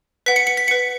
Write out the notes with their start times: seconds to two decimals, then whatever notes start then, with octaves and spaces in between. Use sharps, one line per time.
0.26 B4 F#5 B6
0.36 C#7
0.47 C#7
0.57 B6
0.67 B4 F#5 C#7